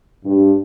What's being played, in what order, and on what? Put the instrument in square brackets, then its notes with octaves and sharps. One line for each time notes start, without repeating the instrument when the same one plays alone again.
[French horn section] G2